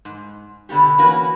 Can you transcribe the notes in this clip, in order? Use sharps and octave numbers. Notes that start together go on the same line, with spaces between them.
G#2
B2 D3 B3 F#4 G4
E3 A#3 C#4 F#4 B4